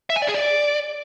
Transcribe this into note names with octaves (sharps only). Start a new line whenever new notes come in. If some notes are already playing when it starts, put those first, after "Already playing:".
E5
G#5
D5
G#4
D5